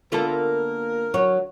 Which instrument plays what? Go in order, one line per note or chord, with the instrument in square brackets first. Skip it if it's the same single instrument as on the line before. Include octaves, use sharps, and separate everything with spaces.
[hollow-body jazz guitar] D3 A4 [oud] A#3 B3 F4 [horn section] A#4
[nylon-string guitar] F#3 [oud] C#5